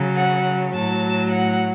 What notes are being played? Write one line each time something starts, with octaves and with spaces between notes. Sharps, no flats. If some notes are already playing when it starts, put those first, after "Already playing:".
Already playing: C#3 F#3
F#5
A2 F#3 A5
F#5